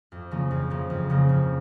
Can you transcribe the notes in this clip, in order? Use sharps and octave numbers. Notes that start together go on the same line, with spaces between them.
F2
C#3 F3 A#3
F2
C#3 F3 A#3
F2
C#3 F3 A#3
F2